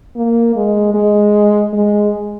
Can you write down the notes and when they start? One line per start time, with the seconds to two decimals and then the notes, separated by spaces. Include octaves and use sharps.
0.16 A#3
0.56 G#3
0.94 G#3
1.73 G#3